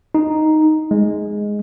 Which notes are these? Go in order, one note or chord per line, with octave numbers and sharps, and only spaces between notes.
D#4
G#3